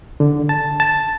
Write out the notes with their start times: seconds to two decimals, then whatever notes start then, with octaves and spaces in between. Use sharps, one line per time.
0.20 D3
0.49 A5
0.80 A5